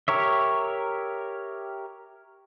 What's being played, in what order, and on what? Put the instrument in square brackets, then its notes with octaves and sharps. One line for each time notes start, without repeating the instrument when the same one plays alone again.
[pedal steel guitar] G4 A#4 C#5 E5